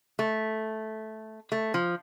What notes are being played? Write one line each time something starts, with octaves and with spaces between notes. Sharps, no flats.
A3
A3
F3